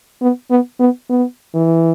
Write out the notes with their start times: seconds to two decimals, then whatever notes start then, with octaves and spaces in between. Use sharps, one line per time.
0.22 B3
0.50 B3
0.80 B3
1.10 B3
1.55 E3